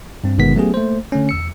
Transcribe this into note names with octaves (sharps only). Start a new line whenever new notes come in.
G2 C4
G1 B2 D#3 G#3 B3 B6
F#3 A3 B3 C#4 G4 G#4
A3 A#3 C5
D3 A3 C#4
E2 E6 C#7